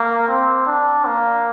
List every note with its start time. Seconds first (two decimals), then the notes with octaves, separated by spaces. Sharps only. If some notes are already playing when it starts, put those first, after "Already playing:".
Already playing: A#3
0.28 C4
0.66 D4
1.05 A#3